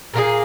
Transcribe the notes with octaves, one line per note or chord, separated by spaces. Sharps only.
A#2 A#3 F4 G#4